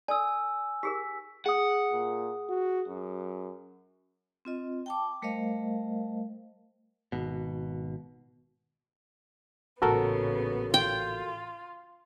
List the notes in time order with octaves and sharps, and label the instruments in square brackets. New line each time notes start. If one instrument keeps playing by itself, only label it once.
[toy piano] A4 D5 [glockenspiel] G#5 E6
[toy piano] G4 G#4 A#4 [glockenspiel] B6
[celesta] G#4 D#6 [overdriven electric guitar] F#5
[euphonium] A#2
F#4
F#2
[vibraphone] C4 F4 D#5
G5 A5 D6
G3 A3 A#4 C5 D#5 F5
[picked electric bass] G#1 B2
[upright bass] A1 A#2 [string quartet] C#3 B3 [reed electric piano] F#4 A4 A#4
[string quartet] F4 [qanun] G5